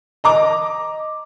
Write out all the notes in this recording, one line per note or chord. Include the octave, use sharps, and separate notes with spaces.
D#5 A#5 D6